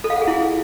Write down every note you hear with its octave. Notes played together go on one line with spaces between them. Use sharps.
A4
F5
F#5
G#4
E4